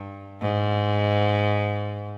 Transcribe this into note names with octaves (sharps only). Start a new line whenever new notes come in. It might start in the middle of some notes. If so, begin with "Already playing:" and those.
Already playing: G2
G#2